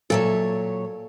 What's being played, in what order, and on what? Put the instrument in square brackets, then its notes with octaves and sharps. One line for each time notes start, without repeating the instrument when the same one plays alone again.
[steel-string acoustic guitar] A#2 F#3 C#5 [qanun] A4 E5